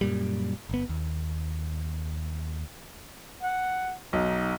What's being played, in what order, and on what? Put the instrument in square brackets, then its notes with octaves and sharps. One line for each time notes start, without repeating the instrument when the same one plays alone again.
[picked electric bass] F#2 A#2 G3
G1 B3
D#2
[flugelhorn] F#5
[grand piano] B1 [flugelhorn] D#4